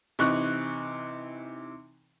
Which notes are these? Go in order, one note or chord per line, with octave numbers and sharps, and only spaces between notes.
C3 E3 D#4 C#6 F#6